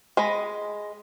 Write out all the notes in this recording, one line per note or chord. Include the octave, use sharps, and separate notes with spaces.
G#3 D#5 B5